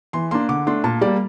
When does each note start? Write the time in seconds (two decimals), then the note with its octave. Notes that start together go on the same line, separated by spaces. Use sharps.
0.13 E3 C6
0.31 A#3 D4 C6
0.49 D3 D6
0.67 A3 D4 C6
0.84 A#2 A5
1.01 G3 A#3 D5